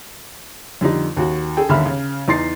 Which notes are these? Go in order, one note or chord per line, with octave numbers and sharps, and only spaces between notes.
F2 D3 G3 D#4
D#2 F#4
G#4 A4 G5
G1 D#2 D3 E5 B5 F6
C#3
E2 D#4 C6 A6 C7